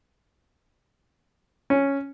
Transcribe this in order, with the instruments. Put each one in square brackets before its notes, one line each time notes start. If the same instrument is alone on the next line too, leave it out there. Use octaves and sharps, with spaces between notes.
[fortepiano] C#4